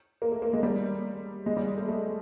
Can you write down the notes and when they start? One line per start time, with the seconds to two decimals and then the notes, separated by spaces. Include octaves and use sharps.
0.22 A#3
0.32 A3
0.42 A#3
0.53 G#3
0.63 G3
1.46 G#3
1.56 G3
1.77 A3
1.88 A3